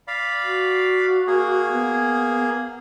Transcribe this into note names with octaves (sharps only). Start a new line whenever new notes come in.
D5 F5 B5
F#4
A#3 G#4
B3